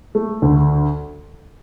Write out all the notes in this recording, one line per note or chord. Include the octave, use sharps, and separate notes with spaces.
A3
D2